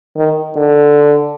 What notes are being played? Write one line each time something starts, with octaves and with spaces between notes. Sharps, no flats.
D#3
D3